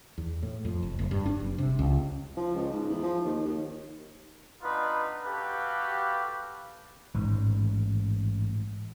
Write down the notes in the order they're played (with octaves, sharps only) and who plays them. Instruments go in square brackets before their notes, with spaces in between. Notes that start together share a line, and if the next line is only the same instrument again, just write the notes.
[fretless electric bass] E2
A2
F2
F1
F#1
G2
D4
F#1
C3
C#2
[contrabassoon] F3
C#2
G#2
E2
F3
D#2
D#2
[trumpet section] B3 D4 D#4 F4 B4
F#4 G4 A4 B4 F5
[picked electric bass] A1 G#2